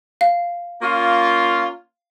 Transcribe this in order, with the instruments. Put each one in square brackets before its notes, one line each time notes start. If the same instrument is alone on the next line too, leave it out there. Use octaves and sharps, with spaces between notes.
[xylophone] F5
[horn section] A#3 C#4 F4